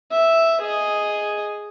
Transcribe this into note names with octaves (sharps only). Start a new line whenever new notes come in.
E5
G#4 D#5